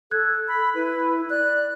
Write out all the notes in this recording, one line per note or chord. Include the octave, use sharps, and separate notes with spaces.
A4 F#6 G#6
B5
E4 B4
D5 F#6